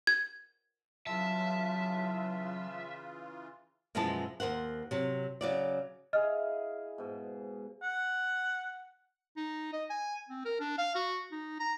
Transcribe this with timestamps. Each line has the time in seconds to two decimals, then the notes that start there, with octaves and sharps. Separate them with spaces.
0.07 G#6
1.07 C#3 E3 F#3 F4 E5 A5
3.95 F#2 B2 F3 G#3 E4 A5
4.40 D#2 A#4 C5 F#5
4.91 C3 F#3
5.41 C#3 F#3 D5
6.13 E4 G#4 D#5 F5 F6
6.98 G#2 B2
7.83 F#5
9.37 D#4
9.73 D#5
9.90 G#5
10.29 C4
10.45 A#4
10.60 D4
10.78 F5
10.95 F#4
11.32 D#4
11.59 A#5